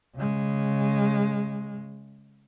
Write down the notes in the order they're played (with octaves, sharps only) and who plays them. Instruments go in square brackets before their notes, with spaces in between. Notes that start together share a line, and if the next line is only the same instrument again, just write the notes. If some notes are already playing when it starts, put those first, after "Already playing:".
[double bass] C#3 G#3